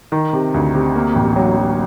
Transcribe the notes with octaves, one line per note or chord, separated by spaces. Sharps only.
D#3
C3
D2
C3
A#3
A1
F#3
F#3